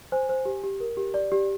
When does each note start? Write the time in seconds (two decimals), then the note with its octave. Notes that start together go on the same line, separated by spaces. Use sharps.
0.12 C5 G#5
0.29 C5
0.45 G4
0.64 G4
0.80 A#4
0.97 G4
1.14 D5
1.32 G4